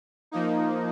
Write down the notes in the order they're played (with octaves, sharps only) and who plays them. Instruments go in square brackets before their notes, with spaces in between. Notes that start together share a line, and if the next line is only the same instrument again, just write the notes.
[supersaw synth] F3 A#3 D#4